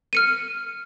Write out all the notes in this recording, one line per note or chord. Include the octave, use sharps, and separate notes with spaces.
F6 C#7 D#7